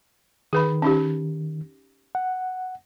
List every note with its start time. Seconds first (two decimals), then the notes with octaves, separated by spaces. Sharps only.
0.53 D#3 G#4 B4 B5
0.82 C#4 D#4 G4
2.15 F#5